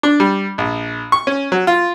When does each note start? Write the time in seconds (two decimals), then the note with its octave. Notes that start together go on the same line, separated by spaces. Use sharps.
0.03 D4
0.20 G3
0.58 A#1
1.12 C#6
1.27 C#4
1.52 F#3
1.67 F4